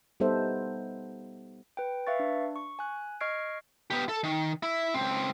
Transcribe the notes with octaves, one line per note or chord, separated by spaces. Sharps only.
G3 B3 D#4 A4 C5 E5
B4 G5
B4 E5 F5 C#6 A6
D4
C#6
G#5 F#6
D#5 C#6 F6 G#6 C7 D7
B3 G4
A4
D#3
E4
C#2 C4